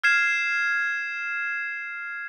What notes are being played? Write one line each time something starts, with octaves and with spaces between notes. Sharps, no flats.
F6 G#6 C7 E7